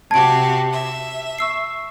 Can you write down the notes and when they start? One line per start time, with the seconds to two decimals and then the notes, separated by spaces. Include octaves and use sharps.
0.11 C3 F#4 G4 A5 G#6 D7
0.71 E5
1.39 C#6 E6 C7